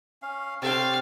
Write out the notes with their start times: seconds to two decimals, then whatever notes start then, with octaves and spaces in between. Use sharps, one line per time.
0.22 C#4 F5
0.62 C3 A4 C#5 D5 F5 G5 C6